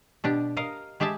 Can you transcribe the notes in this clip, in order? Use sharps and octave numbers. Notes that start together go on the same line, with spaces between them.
B2 D4 G4
A#4 D#5 F5
G#3 G4 G#4 E5 A5